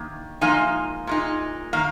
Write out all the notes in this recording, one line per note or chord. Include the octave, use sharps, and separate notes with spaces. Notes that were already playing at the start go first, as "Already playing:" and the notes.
Already playing: D#3 A#3
G#2 F3 A#3 D#4 F5 G#5
A#2 G#3 D#4
D#3 A#3 F5